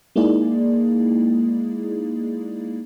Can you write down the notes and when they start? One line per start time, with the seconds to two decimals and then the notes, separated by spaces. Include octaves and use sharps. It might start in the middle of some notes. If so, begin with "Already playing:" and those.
0.16 G#3 A#3 D#4 E4 G#4 D5